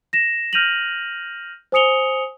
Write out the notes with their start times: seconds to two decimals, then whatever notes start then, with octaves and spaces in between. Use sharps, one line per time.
0.13 A#6 E7
0.53 F6 G6 A#6 D#7 F7 F#7
1.72 C5 G#5 D#6 C#7 F7 G7